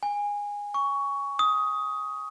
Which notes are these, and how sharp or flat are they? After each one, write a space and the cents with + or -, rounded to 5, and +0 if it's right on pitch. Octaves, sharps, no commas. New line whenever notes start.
G#5 -20
C#6 +15
D#6 +15